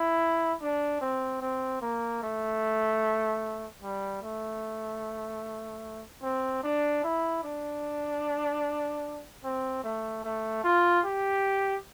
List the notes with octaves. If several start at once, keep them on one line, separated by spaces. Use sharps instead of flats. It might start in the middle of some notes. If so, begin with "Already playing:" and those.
Already playing: E4
D4
C4
C4
A#3
A3
G3
A3
C4
D4
E4
D4
C4
A3
A3
F4
G4